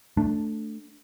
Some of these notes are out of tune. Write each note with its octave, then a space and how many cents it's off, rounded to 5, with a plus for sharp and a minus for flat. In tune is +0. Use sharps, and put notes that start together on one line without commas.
A3 +0 D4 +0